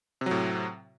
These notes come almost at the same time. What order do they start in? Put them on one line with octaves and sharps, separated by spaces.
C3 F#3 A2